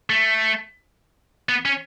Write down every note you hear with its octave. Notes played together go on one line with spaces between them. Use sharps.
A3
B3
C#4